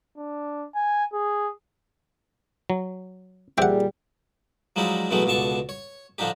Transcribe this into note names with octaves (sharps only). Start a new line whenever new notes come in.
D4
G#5
G#4
F#3
A#2 G3 C4 G4 G#4 E5 F#5 G5
F3 F#3 G#3 D#4 E4 D5
B2 E3 F#3 G#3 A3 B3
C#2 B2 D3 A5 C#6
C#5
D3 F3 D4 D#4 G4